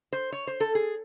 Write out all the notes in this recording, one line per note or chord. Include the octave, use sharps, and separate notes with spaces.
C5
C#5
C5
A4
G#4